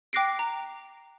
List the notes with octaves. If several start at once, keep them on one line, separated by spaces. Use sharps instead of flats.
G5 D6 F#6 A#6 C7 D7
A#5